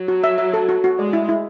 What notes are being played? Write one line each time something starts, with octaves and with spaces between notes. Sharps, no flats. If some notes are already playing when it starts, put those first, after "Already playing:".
Already playing: F#3
F#4
E5
E5
A4
F#4
F#4
G#3 D5
E4
E4